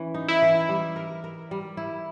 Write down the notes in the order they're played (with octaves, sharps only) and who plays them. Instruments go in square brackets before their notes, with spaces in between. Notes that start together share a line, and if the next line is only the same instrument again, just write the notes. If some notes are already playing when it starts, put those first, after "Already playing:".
Already playing: [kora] E3 C#4
D#4
[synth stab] E4
[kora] E3
G3
A#4
A#4
G3
E4